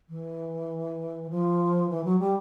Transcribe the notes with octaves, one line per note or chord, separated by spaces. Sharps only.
E3
F3
E3
F#3
G3